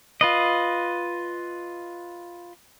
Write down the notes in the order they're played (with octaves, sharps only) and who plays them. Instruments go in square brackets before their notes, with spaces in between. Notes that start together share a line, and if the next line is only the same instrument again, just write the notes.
[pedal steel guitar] F4 B4 D#5